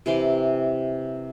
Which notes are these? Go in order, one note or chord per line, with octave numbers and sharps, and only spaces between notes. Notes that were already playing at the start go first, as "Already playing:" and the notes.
C3 E3 C6 D6